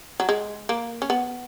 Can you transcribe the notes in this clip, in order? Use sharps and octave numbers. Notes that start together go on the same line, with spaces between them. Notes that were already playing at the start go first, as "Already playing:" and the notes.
F#3
G#3
A#3
C#4
B3